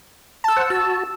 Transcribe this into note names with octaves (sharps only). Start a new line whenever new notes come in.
A5 E6
C5 F#5
F#4 A5 E6